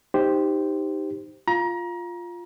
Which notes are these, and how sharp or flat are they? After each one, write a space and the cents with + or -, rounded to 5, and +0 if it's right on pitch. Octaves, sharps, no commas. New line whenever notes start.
D#4 +0 G4 +0 C5 -5
F4 +0 A#5 +30